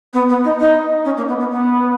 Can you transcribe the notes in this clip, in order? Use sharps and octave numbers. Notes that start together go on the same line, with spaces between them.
B3
B3
D#4
D#4
C#4
A#3
B3
B3
B3